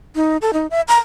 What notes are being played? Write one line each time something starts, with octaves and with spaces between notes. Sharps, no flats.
D#4
A4
D#4
E5
A#5